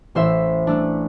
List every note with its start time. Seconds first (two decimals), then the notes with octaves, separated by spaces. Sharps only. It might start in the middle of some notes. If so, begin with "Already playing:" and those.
0.15 A1 C5 E5
0.67 A3 D4